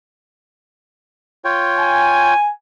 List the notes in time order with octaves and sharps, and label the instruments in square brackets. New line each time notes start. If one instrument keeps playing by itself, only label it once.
[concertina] F4 C#5 G5
[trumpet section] G#5